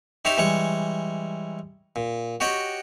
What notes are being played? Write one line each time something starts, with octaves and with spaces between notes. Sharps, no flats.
D#4 G4 C#5 E5 A#5 C6
E3 G3 G#3 C#5 C#6
A#2
F#4 G4 C#5 D#5 F#5 G5